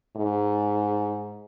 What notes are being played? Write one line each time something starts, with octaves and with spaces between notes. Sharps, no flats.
G#2